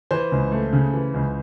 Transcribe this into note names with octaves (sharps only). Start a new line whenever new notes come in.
E3 C5
C#2
A3
C#3
E3
C#2